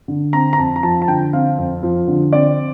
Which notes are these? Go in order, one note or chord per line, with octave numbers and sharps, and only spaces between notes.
D3
C4 A#5
A#5
F2 A5
A#5
F3 A5
A5
D3 G5
C4 F5
F2
F3
D3
C4 D5